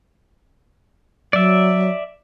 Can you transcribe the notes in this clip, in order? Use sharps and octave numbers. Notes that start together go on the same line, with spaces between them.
F#3 D5 E5